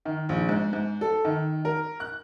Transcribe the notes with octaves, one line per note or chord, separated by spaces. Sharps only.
D#3
A#1
G#2
G#2
A4
D#3
A#4
F#6